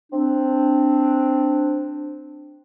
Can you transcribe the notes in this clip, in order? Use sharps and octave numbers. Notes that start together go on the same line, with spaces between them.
C4 D4